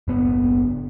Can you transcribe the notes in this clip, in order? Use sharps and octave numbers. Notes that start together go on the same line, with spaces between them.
F#1 B3